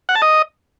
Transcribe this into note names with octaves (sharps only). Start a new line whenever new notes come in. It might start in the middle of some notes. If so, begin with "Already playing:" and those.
F#5
A5
D#5